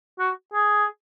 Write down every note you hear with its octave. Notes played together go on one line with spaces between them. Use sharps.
F#4
G#4